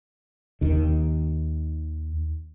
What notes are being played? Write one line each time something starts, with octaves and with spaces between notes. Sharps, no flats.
D#2 D#3